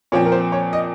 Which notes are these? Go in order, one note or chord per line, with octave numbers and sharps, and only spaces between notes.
A#2 F3 C4 C#5
A#4
C5
C#5
D#5